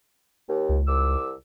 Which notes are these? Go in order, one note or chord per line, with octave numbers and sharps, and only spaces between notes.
D#2
C#2
C2 D6 E6